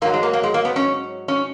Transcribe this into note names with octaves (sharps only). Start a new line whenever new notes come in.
G#2 F#3 A#3
G#3
A#3
A#3
G#3
A#3
B3
C#4
C#4